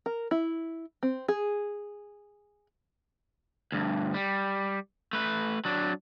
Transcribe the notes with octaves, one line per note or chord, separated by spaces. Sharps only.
A#4
E4
C4
G#4
D2 G2
G3
A3 B4
F#3 D4